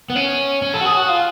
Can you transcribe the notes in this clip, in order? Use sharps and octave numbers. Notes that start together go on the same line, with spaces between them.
B3
C#4
C#4
A4
F#4
G#4
F#4
F4